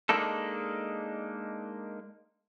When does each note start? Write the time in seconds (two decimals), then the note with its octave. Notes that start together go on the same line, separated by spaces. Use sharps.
0.09 G#3 A#3 D4 D#4 A4